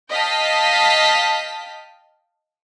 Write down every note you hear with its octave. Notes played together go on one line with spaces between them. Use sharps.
D#5 F5 G5 A5 B6